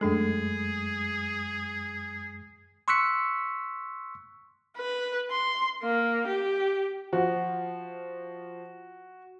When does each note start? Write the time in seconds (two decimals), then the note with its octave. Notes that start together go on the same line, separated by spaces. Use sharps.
0.01 F#2 G#3 A3 D4 G#4 A4
2.88 C6 C#6 E6 F#6 B6 C#7
4.77 B4
5.31 C6
5.83 A#3
6.27 G4
7.13 F3 F#4